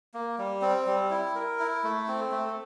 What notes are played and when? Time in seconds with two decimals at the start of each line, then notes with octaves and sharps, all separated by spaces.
0.14 A#3
0.38 G3
0.62 C4
0.87 G3
1.10 E4
1.35 A#4
1.59 E4
1.84 A3
2.08 C4
2.31 A3